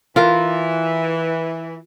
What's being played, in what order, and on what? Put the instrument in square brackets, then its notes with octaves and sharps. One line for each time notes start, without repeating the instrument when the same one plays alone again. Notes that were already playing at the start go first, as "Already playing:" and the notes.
[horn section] E3 [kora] F4 A#4